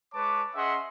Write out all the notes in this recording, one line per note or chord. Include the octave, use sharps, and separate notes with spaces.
G#3 B4 C#5 A5 D6
C#4 G#4 D#5 E5 F#5 C6